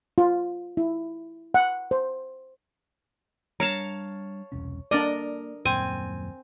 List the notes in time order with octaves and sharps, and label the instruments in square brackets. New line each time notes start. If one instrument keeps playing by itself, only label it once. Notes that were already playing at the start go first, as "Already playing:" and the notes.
[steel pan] F4
E4
F#5
C5
[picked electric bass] G3 D4 [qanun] C#5 F5 A5 [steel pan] A#5
[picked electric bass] E1 C2 C#4
[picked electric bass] A#3 [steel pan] D4 D5 [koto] A#4 D#5
[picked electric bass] D#1 F#2 A#2 [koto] C4 [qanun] G#5